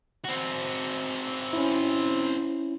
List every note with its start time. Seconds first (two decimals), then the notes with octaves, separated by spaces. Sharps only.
0.24 C4 F#4
1.53 C#4 E4